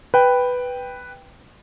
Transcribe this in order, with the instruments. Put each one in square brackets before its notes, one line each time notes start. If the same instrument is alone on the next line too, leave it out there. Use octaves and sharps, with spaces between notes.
[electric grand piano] B4 G5